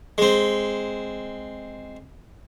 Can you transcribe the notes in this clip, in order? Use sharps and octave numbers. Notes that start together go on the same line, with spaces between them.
G#3 C4